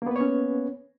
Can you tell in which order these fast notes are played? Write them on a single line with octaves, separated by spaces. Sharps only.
A#3 B3 B4 C#5 C#4